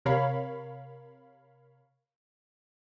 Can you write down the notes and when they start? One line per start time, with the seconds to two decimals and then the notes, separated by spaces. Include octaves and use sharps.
0.05 C3 A#4 C#5 F5 B5